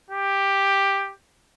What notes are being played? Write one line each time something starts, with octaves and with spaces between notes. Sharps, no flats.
G4